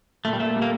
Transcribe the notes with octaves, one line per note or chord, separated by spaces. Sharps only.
A#2 A3
G3
A3 A#3
G3
A#3